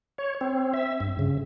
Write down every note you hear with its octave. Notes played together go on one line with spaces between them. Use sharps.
C#5
C4
E5
G2
C#3